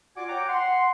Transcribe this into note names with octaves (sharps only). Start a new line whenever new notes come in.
F4 F#4 D5 F#5 G#5 D6
C#5 F#5 G5 A#5 D6
F#5 C6